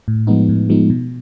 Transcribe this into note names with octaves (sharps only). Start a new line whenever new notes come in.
A2
F3 G#3 B3 D#4
A2
F3 G#3 B3 D#4
B2